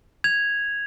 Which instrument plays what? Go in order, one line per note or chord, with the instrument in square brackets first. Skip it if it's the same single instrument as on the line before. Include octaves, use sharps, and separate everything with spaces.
[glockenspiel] G#6 F7